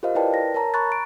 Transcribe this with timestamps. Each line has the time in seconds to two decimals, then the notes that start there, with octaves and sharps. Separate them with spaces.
0.03 F4 G4 A#4 C5 D#5 F5
0.15 E4 A#4 B4 D5 G5 A5
0.34 A#6
0.54 A#4 C#5 A5 A#5
0.74 A#5 B5 C#6 F#6 A6
0.92 D7